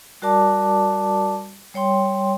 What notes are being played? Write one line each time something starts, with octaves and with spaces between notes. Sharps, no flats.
G3 F#4 A#4 D5 A5 D6
G3 C#5 G5 C6